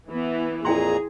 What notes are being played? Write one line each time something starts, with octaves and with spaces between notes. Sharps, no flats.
E3 B3
F2 A#2 E4 G#4 G5 A#5 C6